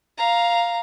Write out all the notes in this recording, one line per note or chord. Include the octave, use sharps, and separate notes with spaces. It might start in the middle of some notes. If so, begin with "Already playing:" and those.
F5 A#5